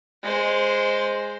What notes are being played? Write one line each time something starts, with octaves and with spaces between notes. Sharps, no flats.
G#3 C5